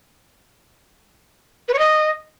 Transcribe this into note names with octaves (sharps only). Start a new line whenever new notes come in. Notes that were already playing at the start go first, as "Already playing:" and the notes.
B4
C#5
D#5